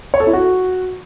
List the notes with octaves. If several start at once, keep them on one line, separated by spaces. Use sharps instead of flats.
C#5
A4
E4
F#4